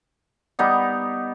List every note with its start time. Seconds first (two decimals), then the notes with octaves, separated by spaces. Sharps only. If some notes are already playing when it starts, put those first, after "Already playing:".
0.59 G3 B3 D#4